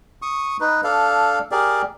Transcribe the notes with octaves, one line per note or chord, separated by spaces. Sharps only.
C#6 D#6
D#4 B4
D4 A4 F5
G4 G#4 A#4 D5